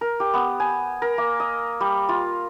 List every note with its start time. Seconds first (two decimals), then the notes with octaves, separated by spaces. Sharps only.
0.01 A#4
0.20 G4
0.34 B3
0.60 G#5
1.02 A#4
1.18 A#3
1.40 D#5
1.81 G3
2.09 F4